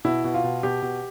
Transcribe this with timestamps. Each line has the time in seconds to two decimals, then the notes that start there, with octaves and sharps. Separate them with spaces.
0.05 B2 E4
0.24 B2
0.34 F4
0.44 B2
0.63 B2 G4
0.82 B2